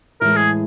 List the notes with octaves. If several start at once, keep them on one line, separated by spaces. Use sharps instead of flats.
A2 E3 G#3 A#4
G#4